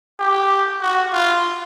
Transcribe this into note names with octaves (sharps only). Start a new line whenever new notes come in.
G4
F#4
F4